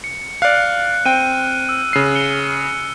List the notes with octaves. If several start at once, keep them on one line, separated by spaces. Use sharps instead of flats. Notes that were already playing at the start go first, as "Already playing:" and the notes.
C#7
D5 F5 F6 F#6
C4 G5 D#7
E6
C#3 C7
C#7 G7